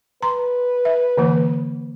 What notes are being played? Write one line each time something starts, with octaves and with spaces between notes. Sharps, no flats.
B4 A#5 C6
E5
D3 E3 A#3